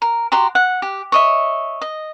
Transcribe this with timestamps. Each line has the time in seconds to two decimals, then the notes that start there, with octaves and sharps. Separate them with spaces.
0.02 A#4
0.32 F#4 G4 A#5 C6
0.55 F#5
0.82 G4
1.12 C#5 D#5 E5
1.81 D#5